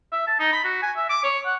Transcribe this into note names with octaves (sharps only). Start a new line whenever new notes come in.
E5
A5
D#4
B5
F#4
G#5
E5
D6
C#5
F#5